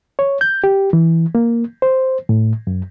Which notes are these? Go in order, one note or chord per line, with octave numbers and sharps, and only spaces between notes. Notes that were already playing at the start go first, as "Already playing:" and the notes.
C#5
G6
G4
E3
A#3
C5
A2
F#2